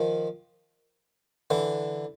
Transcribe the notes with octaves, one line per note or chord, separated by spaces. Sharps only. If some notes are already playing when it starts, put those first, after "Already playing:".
Already playing: D#3 F3
D3 E3